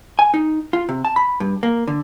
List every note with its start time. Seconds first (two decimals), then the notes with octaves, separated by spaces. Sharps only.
0.19 G#5
0.34 D#4
0.73 F4
0.89 C3
1.05 A5
1.16 B5
1.40 G2
1.63 A#3
1.88 D3